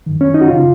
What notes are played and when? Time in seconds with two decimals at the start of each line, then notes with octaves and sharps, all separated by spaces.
0.06 F#2 D#3
0.21 C#4
0.34 D#4
0.41 F#4
0.46 F#2 C#3 F4